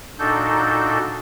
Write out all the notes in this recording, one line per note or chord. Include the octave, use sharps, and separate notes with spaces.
A#2 D4 D#4 F#4 A4 G6